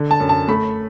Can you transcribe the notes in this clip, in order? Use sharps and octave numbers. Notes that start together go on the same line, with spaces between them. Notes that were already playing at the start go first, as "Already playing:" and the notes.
Already playing: D3
A5
F#2
A5
A3 B5